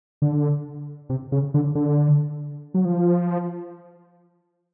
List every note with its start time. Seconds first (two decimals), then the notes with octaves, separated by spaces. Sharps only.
0.22 D3
1.09 C3
1.32 C#3
1.54 D3
1.75 D3
2.74 F#3
2.85 F3